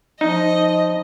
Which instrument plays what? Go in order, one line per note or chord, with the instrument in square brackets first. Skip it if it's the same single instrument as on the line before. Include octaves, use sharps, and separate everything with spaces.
[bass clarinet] F3 [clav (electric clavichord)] D#4 [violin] D#5